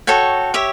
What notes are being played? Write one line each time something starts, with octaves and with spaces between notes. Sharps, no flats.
F#4 A4 C#5 G5
G4 C#5 E5